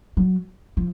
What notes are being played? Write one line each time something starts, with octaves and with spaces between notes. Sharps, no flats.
F#3
F3